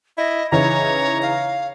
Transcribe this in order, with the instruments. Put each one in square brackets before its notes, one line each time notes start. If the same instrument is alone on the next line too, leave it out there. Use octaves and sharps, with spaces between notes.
[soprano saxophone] E4 [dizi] D#5
[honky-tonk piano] C#3 E3 D#4 [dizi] C#5 [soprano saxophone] A#5
[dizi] F5